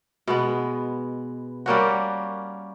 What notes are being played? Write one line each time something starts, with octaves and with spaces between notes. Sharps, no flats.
B2 G#3 B3
G3 A#3 C#4 F#4